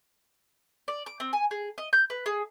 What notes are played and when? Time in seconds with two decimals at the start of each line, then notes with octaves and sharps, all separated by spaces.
0.88 D5
1.06 D6
1.20 C4
1.33 G#5
1.51 G#4
1.78 D#5
1.93 G6
2.10 B4
2.26 G#4